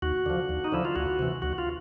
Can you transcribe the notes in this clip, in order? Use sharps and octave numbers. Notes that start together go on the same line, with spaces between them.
D#2 F#4
D3 F3
D#2
D#4
D3 F3 E4
F4
D2 F#4
C3 E3
D2 F#4
F4